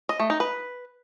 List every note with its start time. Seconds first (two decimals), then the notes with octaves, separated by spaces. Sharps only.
0.09 D#5
0.20 A3
0.30 D#4
0.40 B4